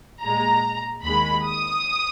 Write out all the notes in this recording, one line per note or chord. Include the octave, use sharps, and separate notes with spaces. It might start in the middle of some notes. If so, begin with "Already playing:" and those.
A#2 G#3 A#5
D#2 D#3 G#3 B5
D#6